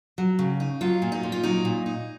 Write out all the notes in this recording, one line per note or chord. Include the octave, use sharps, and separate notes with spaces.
F#3
C#3
D#4
F#3 F4
A#2
D#4
A#2
F4
F#3 D#4
A#2
D#4